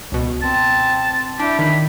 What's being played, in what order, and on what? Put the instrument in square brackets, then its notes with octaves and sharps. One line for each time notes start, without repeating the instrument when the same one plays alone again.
[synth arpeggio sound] C#2 B2
[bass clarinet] C4 [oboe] A5
[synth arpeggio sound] D4 [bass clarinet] E4 [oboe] G4
[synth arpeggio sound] D#3 [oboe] B5